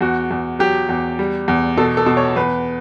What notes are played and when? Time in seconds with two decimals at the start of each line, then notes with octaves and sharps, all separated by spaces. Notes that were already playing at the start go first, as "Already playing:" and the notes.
0.01 E2 F#4
0.31 E2
0.59 F#3 G4
0.89 E2
1.19 G3
1.48 E2
1.77 B2 A4
1.97 A4
2.06 B2
2.17 C#5
2.36 E2 B4